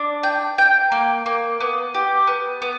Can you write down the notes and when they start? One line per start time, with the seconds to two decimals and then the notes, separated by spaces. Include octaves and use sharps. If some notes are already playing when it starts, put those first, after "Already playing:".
Already playing: D4
0.23 G5
0.58 G5
0.92 A#3
1.26 A#3
1.60 B3
1.94 G4
2.27 B3
2.62 B3